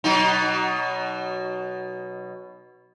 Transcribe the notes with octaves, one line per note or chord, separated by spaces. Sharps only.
B2 F#3 D#4